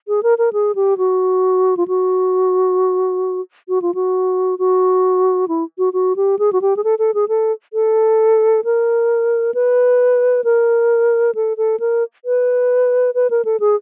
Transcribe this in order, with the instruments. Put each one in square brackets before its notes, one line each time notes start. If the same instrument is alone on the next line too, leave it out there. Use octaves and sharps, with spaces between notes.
[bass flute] G#4
A#4
A#4
G#4
G4
F#4
F4
F#4
F#4
F4
F#4
F#4
E4
F#4
F#4
G4
G#4
F#4
G4
G#4
A4
A4
G#4
A4
A4
A#4
B4
A#4
A4
A4
A#4
B4
B4
A#4
A4
G#4